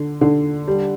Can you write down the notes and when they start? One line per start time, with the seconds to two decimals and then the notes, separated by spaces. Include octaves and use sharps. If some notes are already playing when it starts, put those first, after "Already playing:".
Already playing: D3
0.21 D3
0.68 G3